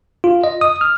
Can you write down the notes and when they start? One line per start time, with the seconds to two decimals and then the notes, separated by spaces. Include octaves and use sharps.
0.24 F4
0.44 D#5
0.61 D#6
0.81 F6